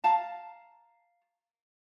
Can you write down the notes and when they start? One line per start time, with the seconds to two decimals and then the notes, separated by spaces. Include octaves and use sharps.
0.04 F5 A5 A#5